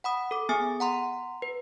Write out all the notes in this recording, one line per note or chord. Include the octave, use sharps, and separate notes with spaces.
F#5 B5 D#6
A4 D6
B3 G#4 G#5 D#6
F#5 A#5 C6
B4